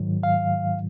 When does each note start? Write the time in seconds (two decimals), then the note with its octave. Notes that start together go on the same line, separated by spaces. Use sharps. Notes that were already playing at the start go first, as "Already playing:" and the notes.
Already playing: G#2 D#3 F#3
0.23 F5